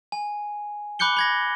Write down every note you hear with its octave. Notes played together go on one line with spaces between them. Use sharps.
G#5
B5 D6 F#6 G6 C#7 G7
B5 G#6 A#6